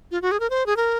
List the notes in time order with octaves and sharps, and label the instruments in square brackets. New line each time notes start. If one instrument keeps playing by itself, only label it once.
[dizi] F4
F#4
G#4
A#4
C5
G#4
A#4